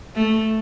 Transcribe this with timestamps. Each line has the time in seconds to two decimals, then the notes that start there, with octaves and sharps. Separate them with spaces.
0.16 A3